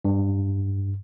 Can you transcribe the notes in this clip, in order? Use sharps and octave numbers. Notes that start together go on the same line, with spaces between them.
G2